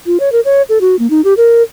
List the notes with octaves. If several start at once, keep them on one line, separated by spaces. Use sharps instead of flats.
F4
C#5
A#4
C#5
A4
F#4
A#3
D#4
G4
A#4